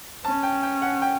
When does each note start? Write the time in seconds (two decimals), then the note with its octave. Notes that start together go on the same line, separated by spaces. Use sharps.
0.24 C#4 A5
0.43 G5
0.63 G5
0.82 F#5
1.02 G5